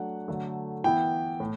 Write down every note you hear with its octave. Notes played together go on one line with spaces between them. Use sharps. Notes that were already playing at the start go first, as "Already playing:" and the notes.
Already playing: F#3 A3 D4 F#5
D3 F#3 A3
E3 B3 E4 G5
A2